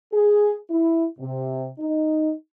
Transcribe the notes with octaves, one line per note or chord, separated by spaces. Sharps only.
G#4
E4
C3
D#4